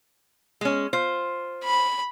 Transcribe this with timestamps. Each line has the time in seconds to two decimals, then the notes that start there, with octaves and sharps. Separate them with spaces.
0.61 G#3 C#4
0.93 F4 C5
1.64 B5